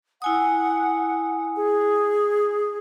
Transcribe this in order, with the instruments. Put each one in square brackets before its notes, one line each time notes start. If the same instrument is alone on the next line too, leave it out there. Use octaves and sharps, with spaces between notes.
[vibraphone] E4 G#5 D#6 [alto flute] F#5
[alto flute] G#4